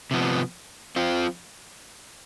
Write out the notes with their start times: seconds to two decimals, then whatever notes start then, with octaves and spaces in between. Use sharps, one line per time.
0.11 C3 F3 B3
0.96 F3 C4 F4